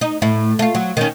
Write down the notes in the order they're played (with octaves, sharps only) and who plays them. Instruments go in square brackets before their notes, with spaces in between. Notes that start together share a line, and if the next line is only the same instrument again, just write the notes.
[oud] D#4
A2 E4
A3 F4
F#3
D#3 C#4